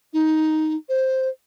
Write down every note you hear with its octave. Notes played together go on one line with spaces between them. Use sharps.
D#4
C5